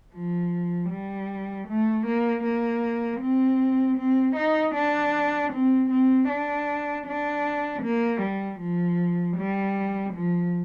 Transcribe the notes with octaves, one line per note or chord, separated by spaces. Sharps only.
F3
G3
A3
A#3
A#3
C4
C4
D#4
D4
C4
C4
D4
D4
A#3
G3
F3
G3
F3